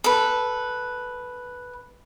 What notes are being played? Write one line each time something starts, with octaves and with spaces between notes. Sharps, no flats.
A4 B4